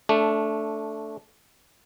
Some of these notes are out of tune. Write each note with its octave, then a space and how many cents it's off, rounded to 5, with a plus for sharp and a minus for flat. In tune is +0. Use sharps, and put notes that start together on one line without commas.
A3 +0 D4 -15